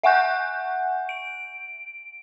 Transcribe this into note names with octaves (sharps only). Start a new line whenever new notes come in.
E5 F#5 G#5 C#6 F#6 G6
D7